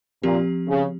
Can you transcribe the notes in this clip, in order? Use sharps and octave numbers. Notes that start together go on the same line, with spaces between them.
A#2 F3 C4 G4
C#3